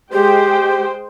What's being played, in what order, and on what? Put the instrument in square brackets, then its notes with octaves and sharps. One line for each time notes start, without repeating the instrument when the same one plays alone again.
[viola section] G#3 C5 G5 [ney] G4